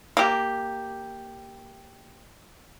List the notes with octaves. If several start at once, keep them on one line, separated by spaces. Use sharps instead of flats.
A#3 G4